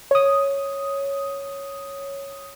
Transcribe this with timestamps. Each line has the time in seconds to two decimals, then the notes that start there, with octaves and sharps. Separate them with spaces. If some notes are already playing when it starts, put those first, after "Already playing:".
0.11 C#5 D#6